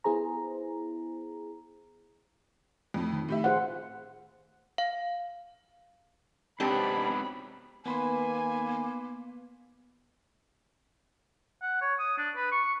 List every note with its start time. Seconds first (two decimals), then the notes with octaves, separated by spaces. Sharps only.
0.04 B3 E4 G#4 C5 A#5
2.94 F2 A2
3.12 D#3
3.28 A2 G4 E5
3.44 F4 G#4 C5 F#5
4.78 F5
6.60 G#2 C3 F#3 B3 C4 D4 G4 B5
7.86 D#3 A#3 B3 B4 G#5 B5 C6
11.62 F#5
11.82 C#5
11.99 D#6
12.18 D4
12.37 B4
12.52 C#6